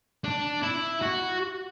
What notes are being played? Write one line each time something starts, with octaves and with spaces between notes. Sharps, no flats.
D4
E4
F#4